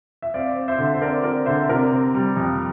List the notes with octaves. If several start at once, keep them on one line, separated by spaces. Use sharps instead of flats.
E5
C4 D5 F5
C4
C5 E5
D3
C5
C4 A#4 D5
C4 A#4 D5
D3 C5 E5
C3 A#4 D5
C4
G3
F2